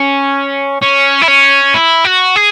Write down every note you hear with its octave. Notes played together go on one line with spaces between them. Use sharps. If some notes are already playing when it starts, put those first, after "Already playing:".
Already playing: C#4
C#4
E4
C#4
E4
F#4
G#4